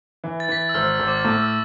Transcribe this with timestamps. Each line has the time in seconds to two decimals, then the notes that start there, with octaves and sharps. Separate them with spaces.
0.24 E3
0.40 A6
0.49 E3 B6
0.57 A6
0.69 E6
0.74 G#1 F6
0.92 E6
0.99 G#1
1.08 D6
1.25 A2 D6
1.42 E6